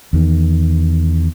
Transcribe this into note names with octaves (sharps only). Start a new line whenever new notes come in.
E2 D#3